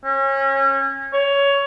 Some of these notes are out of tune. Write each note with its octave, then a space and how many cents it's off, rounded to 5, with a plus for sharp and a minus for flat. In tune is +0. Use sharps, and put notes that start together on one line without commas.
C#4 -30
C#5 +15